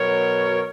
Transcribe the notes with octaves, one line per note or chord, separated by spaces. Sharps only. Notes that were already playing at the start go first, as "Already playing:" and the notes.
Already playing: B2 F#3 A#4 C#5